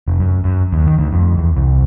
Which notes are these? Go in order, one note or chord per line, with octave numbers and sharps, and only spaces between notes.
F1
F#2
F#2
D#2
D#3
D2
F2
E2
C2